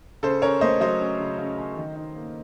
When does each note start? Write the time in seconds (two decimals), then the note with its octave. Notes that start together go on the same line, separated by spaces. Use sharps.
0.23 C#3 A4 C5
0.42 C#4 A#4 C#5
0.61 A3 C5 D#5
0.81 F#3 C5 D#5
1.00 C#4
1.20 C#3
1.38 C#3
1.58 C#4
1.76 D#3
1.96 D#4
2.15 A#3